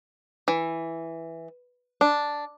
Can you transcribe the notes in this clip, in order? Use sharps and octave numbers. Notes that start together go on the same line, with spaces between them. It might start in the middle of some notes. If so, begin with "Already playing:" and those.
E3
D4